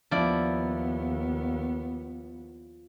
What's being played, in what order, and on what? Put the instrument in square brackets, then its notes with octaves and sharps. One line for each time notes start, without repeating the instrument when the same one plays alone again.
[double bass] D#2 B3 [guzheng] F3 E4 D5